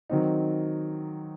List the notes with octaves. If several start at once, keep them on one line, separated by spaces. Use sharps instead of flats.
D#3 F#3 C4 D#4